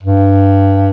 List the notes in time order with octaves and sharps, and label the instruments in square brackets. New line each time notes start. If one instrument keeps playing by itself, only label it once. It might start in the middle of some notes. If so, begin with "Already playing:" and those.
[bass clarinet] G2